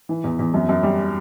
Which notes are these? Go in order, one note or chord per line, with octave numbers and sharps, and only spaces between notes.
E3
E2
E2
F#2
F#2
G3